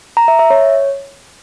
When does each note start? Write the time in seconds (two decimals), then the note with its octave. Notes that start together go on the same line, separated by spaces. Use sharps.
0.17 A#5
0.28 E5
0.39 E5
0.50 C#5